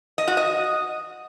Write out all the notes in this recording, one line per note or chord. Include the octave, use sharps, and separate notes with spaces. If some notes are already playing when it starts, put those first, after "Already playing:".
D#5
F#4
D#5